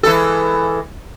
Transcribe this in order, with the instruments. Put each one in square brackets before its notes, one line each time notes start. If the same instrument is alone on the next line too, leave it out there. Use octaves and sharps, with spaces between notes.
[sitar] E3 G#3 A4